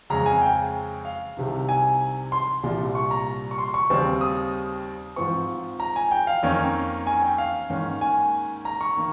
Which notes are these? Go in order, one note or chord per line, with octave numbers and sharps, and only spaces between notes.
F2 C#3 G#3 A#5
G#5
G5
F5
C2 C3 D#3
G#5
C6
C2 A#2 G3
C#6
A#5
C#6
C6
C#6
D#2 C#3 G3 C4
D#6
G#2 F3 C4 C#6
A#5
G#5
G5
F5
F2 D#3 A#3 C#4
G#5
G5
F5
G#2 D#3 A#3 C#4
G#5
A#5
C#6
D#3 A#3